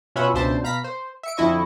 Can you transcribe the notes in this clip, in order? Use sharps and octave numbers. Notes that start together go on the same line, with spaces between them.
B2 C#4 F4 E5 F#5 B5
C#2 B2 D4 C5 E5 A5
B2 F5 A#5 B5 B6
C5
E5 C#7 D7
F2 D3 E4 D#5 C#6